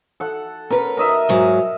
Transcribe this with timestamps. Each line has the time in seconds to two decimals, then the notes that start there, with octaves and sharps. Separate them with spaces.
0.20 A4 F#5
0.71 C#4 A#4 B4
0.97 A#4 D#5 E5
1.29 G#2 F#3